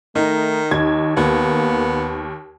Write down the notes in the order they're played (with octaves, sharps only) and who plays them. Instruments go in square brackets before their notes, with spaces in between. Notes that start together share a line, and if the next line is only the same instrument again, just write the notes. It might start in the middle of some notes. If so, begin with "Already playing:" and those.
[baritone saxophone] D#3 [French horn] A3 [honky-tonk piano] D#4
[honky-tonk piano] D#2 G#6 [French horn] D#4
[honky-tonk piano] D#2 [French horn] A#3 [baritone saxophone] B3